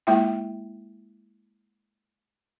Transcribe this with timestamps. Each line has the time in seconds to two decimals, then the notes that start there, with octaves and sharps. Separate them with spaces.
0.07 G#3 A#3 E4 F4 E5 G5